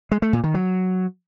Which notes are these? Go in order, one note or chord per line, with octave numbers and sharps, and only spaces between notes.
G#3
A3
A#2
D#3
F#3